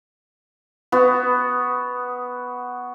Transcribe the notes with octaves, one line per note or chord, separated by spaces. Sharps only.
B3 F#4